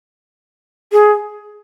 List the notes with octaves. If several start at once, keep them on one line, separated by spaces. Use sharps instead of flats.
G#4